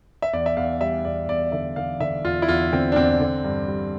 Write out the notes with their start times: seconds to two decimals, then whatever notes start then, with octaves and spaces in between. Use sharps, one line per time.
0.22 E5
0.33 E2 D5
0.46 E5
0.57 E2 F5
0.81 G3 E5
1.05 E2 D5
1.28 E2 D5
1.52 D3 E5
1.76 D3 F5
2.00 D3 E5
2.24 E2 F4
2.42 E4
2.48 E2 F4
2.72 D3 C4
2.92 D4
2.96 E2 C4
3.20 D3
3.44 G2
3.68 G3